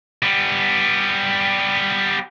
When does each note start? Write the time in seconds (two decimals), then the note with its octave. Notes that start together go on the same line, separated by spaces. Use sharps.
0.23 G3 B3